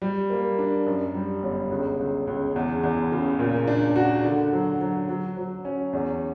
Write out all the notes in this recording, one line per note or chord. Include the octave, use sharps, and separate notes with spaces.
G3
A#3
D4
F#2
G3
G1
C#2
C#2
C#2
E2
E2
C#3
A#2
D4
F#4
D3
F#3
F#3
F#3
F#3
C#4
E2